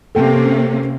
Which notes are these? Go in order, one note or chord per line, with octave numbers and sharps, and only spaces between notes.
C3 A#3 C#4 A4 G5